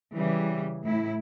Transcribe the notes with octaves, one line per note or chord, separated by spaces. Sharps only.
C#3 E3 G3
A2 E4